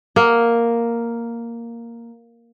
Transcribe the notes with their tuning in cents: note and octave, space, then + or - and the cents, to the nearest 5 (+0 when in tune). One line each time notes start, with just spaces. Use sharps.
A#3 +0 D#5 +0 F#5 +0